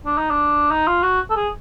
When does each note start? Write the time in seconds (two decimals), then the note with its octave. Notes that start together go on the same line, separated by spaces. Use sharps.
0.05 D4
0.18 D#4
0.30 D4
0.71 D#4
0.87 F4
1.03 F#4
1.30 A4
1.36 G#4